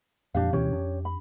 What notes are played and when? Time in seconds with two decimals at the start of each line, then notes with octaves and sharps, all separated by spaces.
0.35 F2 A#2 F3 D4 G4 F5
0.53 D2 B2 E3 C#4 G4 C#5
0.72 F2 D4
1.05 B5